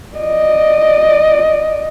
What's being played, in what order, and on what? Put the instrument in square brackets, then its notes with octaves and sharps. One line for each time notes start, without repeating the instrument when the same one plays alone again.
[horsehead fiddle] D5 D#5